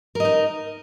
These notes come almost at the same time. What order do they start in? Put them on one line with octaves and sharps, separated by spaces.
A#4 D#5 D#4